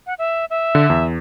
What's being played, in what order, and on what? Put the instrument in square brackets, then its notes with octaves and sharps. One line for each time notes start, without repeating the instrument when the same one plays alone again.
[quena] F#5
E5
E5
[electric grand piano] D3
E2